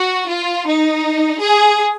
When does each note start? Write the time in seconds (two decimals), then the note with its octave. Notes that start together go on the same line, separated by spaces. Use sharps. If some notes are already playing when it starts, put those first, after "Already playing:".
Already playing: F#4
0.29 F4
0.67 D#4
1.41 G#4